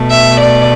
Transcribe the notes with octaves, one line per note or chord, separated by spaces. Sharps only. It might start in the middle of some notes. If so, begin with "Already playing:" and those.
Already playing: B2 A3
E5
D5